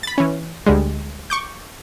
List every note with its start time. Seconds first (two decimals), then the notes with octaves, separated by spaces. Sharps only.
0.03 B5 A6
0.18 E3 C#4
0.66 D2 D3 G3 G#3
1.30 C#6 D6 G6